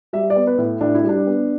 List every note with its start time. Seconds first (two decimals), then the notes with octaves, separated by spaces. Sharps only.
0.13 G3 E5
0.30 D5
0.36 B3
0.47 B4
0.58 A2
0.81 A2 D4
0.95 E4
1.04 G3 D4
1.27 B3